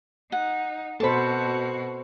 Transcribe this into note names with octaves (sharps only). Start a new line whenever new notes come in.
D#4 F#5
B2 F#4 A4 C5 A5 B5